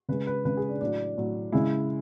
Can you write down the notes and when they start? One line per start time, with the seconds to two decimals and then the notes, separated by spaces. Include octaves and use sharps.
0.09 C#3 G#3 B4
0.27 B4
0.45 C#3 G#3 B4
0.57 G#4
0.69 D4
0.81 A2 F#3 D4
1.17 A2 F#3
1.52 C#3 G#3 E4